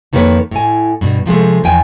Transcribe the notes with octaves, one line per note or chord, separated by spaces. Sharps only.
F2 D#3 A#3 A4 B4 C#5
A2 G#5
G2 B2
C3 F3 G#3 A3
E2 F3 G5 G#5